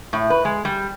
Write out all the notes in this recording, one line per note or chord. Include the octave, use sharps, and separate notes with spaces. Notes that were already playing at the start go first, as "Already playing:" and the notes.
A2
B4
G#3
G3